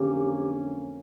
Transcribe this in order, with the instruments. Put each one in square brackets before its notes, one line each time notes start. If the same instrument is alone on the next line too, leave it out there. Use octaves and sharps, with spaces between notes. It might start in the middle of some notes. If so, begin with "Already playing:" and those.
Already playing: [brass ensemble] F2 D3 F#3 A#3 C#4 [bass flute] G4